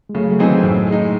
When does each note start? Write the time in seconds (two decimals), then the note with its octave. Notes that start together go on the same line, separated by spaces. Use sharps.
0.09 G#3
0.15 C#3 F#3 A3
0.31 F#3 A3
0.39 E3 G#3 C4 D#4 G#4
0.47 D#3 F#3
0.63 A2
0.87 G#3
0.92 D#4